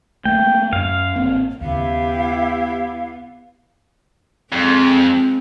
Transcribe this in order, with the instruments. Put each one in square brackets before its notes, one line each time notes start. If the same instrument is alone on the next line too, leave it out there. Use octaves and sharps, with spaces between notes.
[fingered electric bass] A3 A#3 [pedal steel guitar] G5
[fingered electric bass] F#2 [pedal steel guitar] F5
[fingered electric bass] G#1 A#3 C4
[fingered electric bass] D#2 C#3 [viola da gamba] B3 [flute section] E4 G4 [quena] F5
[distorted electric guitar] F2 [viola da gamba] G#3 C4